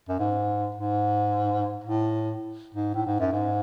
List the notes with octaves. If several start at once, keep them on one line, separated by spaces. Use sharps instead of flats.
F#2
G#2
G#2
A2
G#2
A2
G#2
F#2
G#2